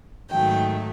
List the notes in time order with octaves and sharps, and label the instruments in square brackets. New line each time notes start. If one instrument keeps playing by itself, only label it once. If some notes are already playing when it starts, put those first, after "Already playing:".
[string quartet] G#2 D#3 F#3 A3 G5